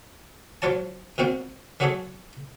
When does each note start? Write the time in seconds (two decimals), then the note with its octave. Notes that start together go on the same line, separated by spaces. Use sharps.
0.62 F3 F#3 F4 C#5 A5
1.18 B2 D#3 C4 F4 F#4
1.80 D#3 F#3 F#4 G#4 A4 C#5